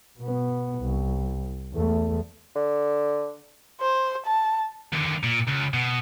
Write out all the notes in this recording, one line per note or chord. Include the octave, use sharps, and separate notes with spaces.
B2 B3
C2
E2 A3
D3
C5
A5
D#2 D3
A#2
C#2
B2